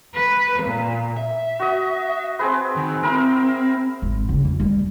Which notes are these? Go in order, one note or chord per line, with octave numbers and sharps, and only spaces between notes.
B4
A#2
E5
F#4 D#5
C4 G#4 B4
D#3
C4 E4 A#4
G#1
C#3
F2
G3